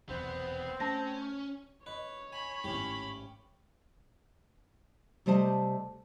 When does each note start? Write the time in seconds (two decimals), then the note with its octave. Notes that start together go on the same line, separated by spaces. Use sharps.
0.09 F1 B1 E2 B3 C4
0.80 A3 C#4 A5 A#6
1.86 B4 C#5 D#5
2.32 G#5 B5
2.64 G#1 A2 C#4 G4
5.26 C3 G3 A3 C5 D#5 A5